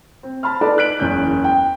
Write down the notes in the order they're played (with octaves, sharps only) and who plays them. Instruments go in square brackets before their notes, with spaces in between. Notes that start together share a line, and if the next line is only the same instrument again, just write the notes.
[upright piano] C4
A5 B5 C6 F6
D#4 A4 B4 D5
F#6 B6 D7 F#7
F#1 E2 C#4 G6
G5